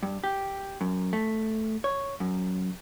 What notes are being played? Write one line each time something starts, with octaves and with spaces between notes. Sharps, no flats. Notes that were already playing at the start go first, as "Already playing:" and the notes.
G2
G4
F#2
A3
C#5
F#2